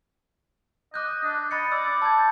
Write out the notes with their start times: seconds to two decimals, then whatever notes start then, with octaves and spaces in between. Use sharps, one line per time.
0.94 D#5 D6 F#6 G6
1.23 D4
1.51 D#5 B5 A6 C#7
1.72 D5 E6
2.02 A5 G6 G#6